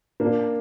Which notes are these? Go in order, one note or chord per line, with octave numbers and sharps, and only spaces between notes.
A#3 D4